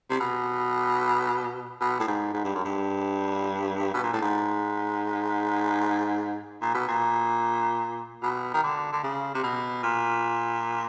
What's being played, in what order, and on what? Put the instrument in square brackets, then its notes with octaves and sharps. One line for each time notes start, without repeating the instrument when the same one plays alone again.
[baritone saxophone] C3
B2
B2
A2
G#2
G#2
G2
F#2
G2
B2
A#2
A2
G#2
A#2
B2
A#2
B2
D#3
D3
D3
C#3
C3
B2
A#2